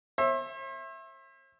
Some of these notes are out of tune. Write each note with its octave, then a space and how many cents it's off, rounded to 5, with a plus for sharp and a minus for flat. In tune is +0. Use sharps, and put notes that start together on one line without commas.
C5 +45 E5 +0